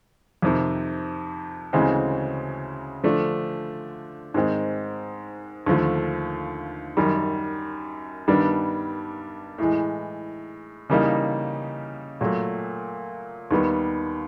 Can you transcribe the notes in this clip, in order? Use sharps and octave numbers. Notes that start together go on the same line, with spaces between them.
F2 C3 D#3
D2 C#3 E3 G#3 C4
D3 F3 A3 D4
G#2 D#3 G#3 C4
D#2 D3 F3 A3
F#2 D#3 G3
G2 D#3 G3 B3 D4
A2 E3 G#3
C#3 E3 G3 A#3 D#4
A#2 F#3 A3
D#2 D#3 G3 B3